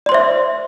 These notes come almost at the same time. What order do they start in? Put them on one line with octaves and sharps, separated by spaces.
D5 C6 C5 E5